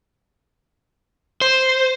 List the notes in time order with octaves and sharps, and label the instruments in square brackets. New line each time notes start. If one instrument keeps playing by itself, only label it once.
[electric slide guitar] C5